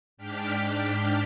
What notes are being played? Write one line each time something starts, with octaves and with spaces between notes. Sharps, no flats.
G#2 D4 G5 D6 F6 B6